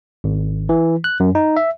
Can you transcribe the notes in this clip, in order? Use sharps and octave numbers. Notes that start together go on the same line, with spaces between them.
G#1
E3
F#6
F#2
D#4
E5